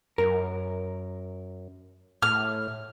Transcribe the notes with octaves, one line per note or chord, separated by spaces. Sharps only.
F#2 A#4
A2 F6